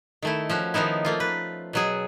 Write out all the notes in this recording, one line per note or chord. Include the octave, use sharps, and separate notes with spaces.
D#3 A3 E4
F3 C#4 F#4
D#3 F3 B3 D#4 E4
A3 A#3 F4
B4
B2 F#3 G#4